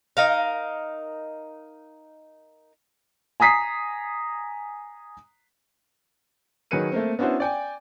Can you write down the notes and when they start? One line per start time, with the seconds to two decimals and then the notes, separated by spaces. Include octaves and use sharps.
0.17 D#4 A#4 F5
3.40 G#5 A#5 D#6 B6 C7
6.71 D#3 F#3 G#4 B4 C#7 D#7
6.92 A3 A#3 C4
7.19 B3 C#4 D4 E4 F#4 C5
7.40 D5 G5 G#5